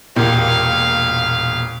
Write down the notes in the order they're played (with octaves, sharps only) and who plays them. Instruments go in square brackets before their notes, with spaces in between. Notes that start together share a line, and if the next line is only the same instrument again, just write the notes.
[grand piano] E1 G4 [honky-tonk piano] A#2 [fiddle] F5